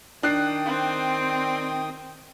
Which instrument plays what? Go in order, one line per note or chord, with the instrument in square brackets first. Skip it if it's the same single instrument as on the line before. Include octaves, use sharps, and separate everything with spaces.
[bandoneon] D#3 G5 D#6 [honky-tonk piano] D4 F#6 C7
[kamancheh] C4